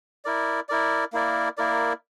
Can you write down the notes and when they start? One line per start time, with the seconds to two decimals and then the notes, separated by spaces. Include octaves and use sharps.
0.25 E4 A#4 D5
0.69 E4 A#4 D5
1.13 A#3 E4 A#4 D5
1.57 A#3 E4 A#4 D5